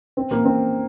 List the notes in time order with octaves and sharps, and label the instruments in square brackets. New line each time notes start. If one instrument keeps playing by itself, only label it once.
[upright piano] C4
A#3
C4